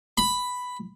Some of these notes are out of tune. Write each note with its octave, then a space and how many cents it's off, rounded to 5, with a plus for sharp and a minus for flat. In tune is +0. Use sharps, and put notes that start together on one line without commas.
B5 +5